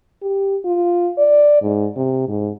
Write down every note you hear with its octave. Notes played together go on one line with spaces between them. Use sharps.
G4
F4
D5
G#2
C3
G#2